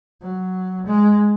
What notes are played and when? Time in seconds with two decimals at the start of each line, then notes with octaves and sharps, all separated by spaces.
0.22 F#3
0.86 G#3